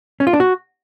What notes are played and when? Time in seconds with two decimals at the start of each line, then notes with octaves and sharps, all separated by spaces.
0.20 C#4
0.27 F4
0.33 D4
0.40 F#4